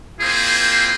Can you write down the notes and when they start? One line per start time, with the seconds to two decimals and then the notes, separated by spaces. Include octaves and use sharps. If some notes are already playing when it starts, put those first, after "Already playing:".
0.21 A#3 C4 E4 F4 G#4 C5